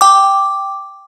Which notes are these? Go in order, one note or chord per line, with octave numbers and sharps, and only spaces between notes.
G5 D6